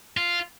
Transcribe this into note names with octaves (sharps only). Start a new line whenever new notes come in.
F4